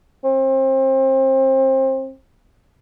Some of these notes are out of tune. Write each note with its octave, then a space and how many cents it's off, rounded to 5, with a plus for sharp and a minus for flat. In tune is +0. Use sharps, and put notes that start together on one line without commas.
C4 +30